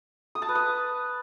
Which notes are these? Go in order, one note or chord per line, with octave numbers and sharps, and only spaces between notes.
D#6
A5
B4
D#6